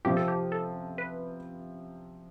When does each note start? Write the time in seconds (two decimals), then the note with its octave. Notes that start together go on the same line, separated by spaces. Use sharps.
0.05 C3 F3 C4 F4 G4
0.17 A4
0.28 G4
0.52 A4
0.98 B4